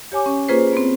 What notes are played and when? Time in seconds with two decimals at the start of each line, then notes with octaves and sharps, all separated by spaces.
0.12 G4 C#5 G#5 D6
0.26 C#4
0.48 A#3 C#4 F4 G#4 B4 C5
0.73 B3 C4